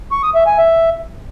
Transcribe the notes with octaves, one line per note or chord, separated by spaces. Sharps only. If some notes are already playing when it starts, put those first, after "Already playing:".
C#6
D#6
E5
G#5
E5